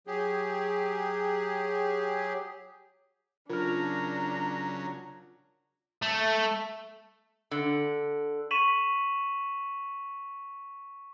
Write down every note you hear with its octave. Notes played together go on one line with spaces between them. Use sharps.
F#3 G4 G#4
C#3 F#3 D4 F4 A#4 A#5 F6
A3
D3
C#6 B6 D#7 E7 F#7